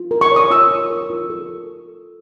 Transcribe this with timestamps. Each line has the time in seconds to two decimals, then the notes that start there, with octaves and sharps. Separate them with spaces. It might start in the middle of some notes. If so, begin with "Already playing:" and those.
Already playing: F4
0.11 A#4
0.21 C#6
0.32 C#5 D#6
0.51 F4 E6
0.71 F4
0.90 A#4
1.10 F4
1.30 A4